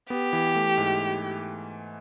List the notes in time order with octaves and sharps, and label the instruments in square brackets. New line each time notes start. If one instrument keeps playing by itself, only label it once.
[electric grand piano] B3 [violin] G4
[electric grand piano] E3
A3
G#2